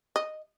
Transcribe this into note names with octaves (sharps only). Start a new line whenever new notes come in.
D#5